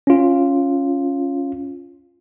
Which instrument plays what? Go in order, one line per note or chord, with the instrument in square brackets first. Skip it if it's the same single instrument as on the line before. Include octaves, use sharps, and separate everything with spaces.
[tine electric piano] C#4 F4